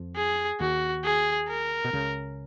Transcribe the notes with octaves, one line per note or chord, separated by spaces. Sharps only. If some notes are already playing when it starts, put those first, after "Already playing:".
Already playing: F2 F3
G#4
D#2 D#3 F#4
G#4
A#4
B2
C#2 C#3